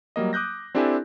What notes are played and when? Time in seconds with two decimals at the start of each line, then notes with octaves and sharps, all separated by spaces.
0.16 F#3 G3 A#3 D#5
0.33 D6 D#6 F#6 G6 A#6
0.75 C4 D4 E4 G4 A4 G#5